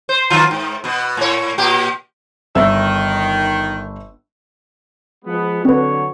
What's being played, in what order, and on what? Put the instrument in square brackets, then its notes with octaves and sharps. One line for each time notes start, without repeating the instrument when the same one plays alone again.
[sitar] C5
D#3 F#3 F4
G#2
B2 B3
A2 C#5
A#2 G4
[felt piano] G1 E5 E6 [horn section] D#3
[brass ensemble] F3 G#3 B3
[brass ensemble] D3 F#3 C#5 [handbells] C4 B4